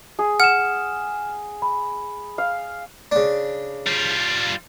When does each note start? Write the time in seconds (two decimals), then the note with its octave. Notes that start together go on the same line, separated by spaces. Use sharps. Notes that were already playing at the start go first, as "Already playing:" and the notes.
0.19 G#4
0.40 F#5 F6 E7
1.62 B5
2.38 F5
3.11 C#3 D4
3.87 G3 F4